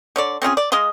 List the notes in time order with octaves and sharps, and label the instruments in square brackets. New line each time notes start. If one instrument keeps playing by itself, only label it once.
[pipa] D3 C#5 D5
C4 C#4 F4 G#4
D5
G#3 D#5 F5 C6